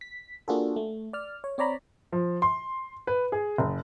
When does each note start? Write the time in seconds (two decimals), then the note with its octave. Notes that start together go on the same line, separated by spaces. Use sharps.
0.01 B6
0.48 A#3 D4 F4 F#4 G#4 A4
0.76 A3
1.13 D5 F6
1.44 C#5
1.58 C4 C#5 D5 A#5 B5
2.12 F3
2.42 C6
3.07 B4
3.32 G#4
3.58 F#1